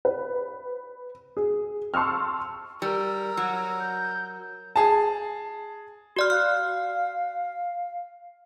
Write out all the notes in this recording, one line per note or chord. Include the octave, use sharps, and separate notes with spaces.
B4
G#4
A5 C6 C#6 E6 F6
G3 A#4 E6
F#3
G6
G#4 A5
F#4 D5 C6 F6
F5 F6 F#6